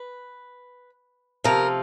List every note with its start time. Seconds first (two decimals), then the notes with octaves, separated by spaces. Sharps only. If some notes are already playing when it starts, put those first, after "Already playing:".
Already playing: B4
1.44 C3 F3 A3 A#4